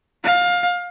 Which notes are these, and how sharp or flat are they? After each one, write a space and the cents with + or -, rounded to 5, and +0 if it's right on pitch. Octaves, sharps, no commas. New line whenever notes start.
F5 +25